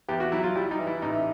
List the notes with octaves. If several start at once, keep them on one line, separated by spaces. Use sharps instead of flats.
E2 G4
F#4
F#3 E4
F4
G3 E4
D#4
E3
E4
A1 D#4